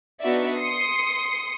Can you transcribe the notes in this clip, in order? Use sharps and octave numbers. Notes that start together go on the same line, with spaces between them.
B3 D4 D#4 F#4 D5 E5
C6 D#6 C7 C#7